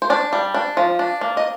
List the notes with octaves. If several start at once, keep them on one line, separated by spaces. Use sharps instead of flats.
C5
D4 D5
G3
D4
F3
D4
A#3
D#5